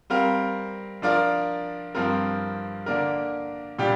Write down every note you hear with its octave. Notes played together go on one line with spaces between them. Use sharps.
G3 C4 A#4 F5
F3 D4 F4 A#4 D5
G2 F3 C4 A#4
D3 A#3 D4 A#4
A#2 G3 D4 G4